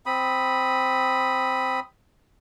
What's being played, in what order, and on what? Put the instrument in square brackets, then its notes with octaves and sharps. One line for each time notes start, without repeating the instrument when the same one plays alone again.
[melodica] C4 B5 D#6